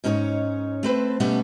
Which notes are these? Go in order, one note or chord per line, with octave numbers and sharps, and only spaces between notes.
G#2 C#4 D#4 A#4 C#5
A3 C4 B4 C5
B2 G3 A3 B3 C#4